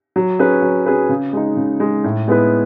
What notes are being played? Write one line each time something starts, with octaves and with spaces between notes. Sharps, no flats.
F#3
C#4 G#4 B4
F#3
C#4 G#4 B4
C#3
G#3 D#4
C#3
G#3 D#4
A2
G#3 B3 E4 B4